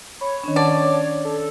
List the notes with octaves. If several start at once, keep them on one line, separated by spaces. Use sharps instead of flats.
C#5 B5
D#3 C#4 D4
D5 F#5 A5 C#6
A4